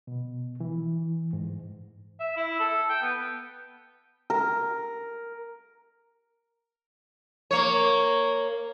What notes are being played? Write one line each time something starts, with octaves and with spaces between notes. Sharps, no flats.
B2
E3
G#2
E5
E4
A4
G5
B3
A#4
A#3 C#5